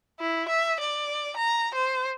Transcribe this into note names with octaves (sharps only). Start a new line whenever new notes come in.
E4
E5
D5
A#5
C5